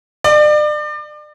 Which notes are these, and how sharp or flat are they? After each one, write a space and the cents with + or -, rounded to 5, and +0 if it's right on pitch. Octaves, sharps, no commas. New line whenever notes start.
D5 +35